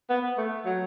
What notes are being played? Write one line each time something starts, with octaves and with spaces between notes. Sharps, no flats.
B3
A3
F#3